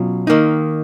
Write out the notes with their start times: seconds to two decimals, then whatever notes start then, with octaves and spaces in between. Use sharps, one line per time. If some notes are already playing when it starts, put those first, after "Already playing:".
Already playing: B2 F#3 C#4 F4
0.27 D#3 A#3 D#4